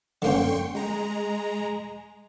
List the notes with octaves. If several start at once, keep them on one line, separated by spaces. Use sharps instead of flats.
D3 A#3 C#4 G5 C6 C#6
G#3 A#5